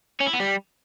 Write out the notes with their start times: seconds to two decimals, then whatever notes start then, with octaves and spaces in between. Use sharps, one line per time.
0.21 C#4
0.27 E4
0.33 B3
0.40 G3